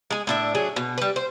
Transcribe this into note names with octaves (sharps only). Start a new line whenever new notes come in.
G#3 G#4
A2 D4 E5
F#3 D4 G#4
B2
G3 B4
C5